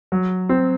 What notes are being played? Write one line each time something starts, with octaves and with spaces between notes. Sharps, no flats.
F#3
C4